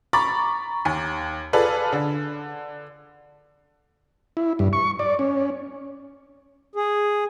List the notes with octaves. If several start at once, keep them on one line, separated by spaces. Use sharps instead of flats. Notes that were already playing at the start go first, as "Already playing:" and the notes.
A#5 B5 C#6 D6 A6
D#2
F4 G#4 A4 B4 D5 F5
D3
E4
G2
C#6
D5
C#4
G#4